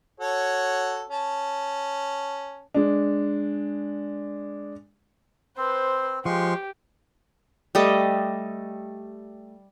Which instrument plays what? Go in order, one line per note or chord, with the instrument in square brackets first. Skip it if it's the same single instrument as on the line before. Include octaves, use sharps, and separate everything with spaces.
[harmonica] F#4 A4 C#5
C#4 A5
[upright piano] G#3 D4
[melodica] C4 [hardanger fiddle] B4 C5
[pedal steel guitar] F3 [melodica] G#3 C6 C#6 [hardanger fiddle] G4
[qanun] G3 A3 D#5